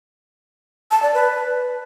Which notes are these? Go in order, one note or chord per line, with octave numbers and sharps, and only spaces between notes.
A5
D5
B4